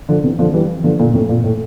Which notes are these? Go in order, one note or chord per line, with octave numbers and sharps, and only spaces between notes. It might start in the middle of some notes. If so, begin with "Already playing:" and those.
D3 F3
C3 E3
D3 F3
E3 G3
D3 F3
A#2 D3
A2 C3
A#2
A2